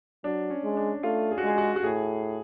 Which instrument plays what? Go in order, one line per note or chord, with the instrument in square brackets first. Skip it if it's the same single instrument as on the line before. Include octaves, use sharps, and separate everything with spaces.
[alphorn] F#3 [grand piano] D4
[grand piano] C#4
[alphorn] G#3
[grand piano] D4
[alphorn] A3 [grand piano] F4
[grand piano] G#4
F#4
[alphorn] G#3 [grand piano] G#4
[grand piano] F#4
F#4
[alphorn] A2 [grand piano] G#4